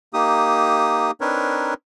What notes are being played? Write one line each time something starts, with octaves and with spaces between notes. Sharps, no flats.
A#3 D#4 G4 D#6
C4 D4 D#4 A#4 B4 C#5